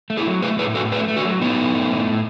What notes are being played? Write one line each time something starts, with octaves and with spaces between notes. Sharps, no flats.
A3
E4 G#4
F#3
A3 G#4 B4
A2 G#4 B4
A2 F#4 A4
A3 G#4 B4
A3
F#4 A4
F#3
A2 B3 D#4
A3
A3
A2
A2